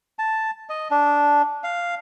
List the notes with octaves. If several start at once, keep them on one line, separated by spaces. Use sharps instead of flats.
A5
D#5
D4
F5